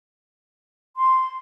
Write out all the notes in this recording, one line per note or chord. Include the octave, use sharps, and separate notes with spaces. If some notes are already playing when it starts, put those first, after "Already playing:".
C6